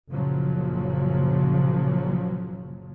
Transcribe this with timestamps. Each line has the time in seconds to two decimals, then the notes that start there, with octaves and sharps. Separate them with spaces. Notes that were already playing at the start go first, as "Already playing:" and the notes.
0.11 F#1 A#2 C#3 F3 F#3